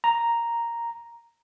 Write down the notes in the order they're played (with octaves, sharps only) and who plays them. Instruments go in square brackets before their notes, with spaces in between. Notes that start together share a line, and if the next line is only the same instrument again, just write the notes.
[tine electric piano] A#5